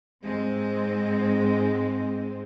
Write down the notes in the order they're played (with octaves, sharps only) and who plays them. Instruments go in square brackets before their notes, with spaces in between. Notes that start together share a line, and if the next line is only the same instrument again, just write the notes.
[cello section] G#2 G#3 C4